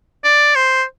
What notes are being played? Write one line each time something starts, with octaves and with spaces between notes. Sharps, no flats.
D5
C5